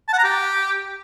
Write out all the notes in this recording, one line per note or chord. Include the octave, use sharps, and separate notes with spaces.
A5
F#5
A#5
G4